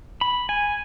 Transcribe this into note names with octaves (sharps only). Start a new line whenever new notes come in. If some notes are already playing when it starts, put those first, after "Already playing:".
B5
G#5